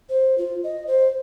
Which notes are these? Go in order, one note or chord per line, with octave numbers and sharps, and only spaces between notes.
C5
F4
D#5
C5